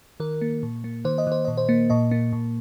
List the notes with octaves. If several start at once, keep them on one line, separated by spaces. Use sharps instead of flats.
D#3 A#4
A#3
A#2
A#3
D#3 C5
D#5
D#3 C5
A#2 D#5
C5
A#3
A#2 D#5
A#3
A#2